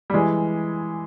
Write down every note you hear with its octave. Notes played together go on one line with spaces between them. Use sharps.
G3
E3 G#3